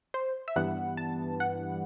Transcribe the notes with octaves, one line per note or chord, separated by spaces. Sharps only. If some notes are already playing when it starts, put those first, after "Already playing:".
C5
E5
G2 E3 G3 B3 F#5
A5
F#5